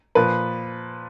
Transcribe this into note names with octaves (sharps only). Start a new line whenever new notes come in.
A#2 F3 B4